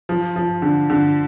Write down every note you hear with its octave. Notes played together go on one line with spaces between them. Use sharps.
F3
F3
D3
D3